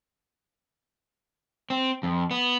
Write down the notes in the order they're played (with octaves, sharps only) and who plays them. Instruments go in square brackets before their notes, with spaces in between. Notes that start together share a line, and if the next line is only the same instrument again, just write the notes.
[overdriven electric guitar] C4
F2
B3